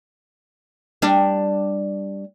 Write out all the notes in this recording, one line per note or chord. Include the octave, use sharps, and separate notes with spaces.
G3 D4